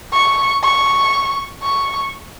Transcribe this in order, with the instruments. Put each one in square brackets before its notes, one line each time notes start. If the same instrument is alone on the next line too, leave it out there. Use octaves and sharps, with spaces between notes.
[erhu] C#6
C#6
C#6